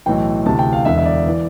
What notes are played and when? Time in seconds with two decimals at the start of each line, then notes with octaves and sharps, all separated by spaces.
0.06 B1 A2 E3 G5
0.46 D2 C3 E3 A5
0.59 G5
0.73 F5
0.85 E1 E2 D3 E5
0.98 E5
1.06 D5
1.26 E3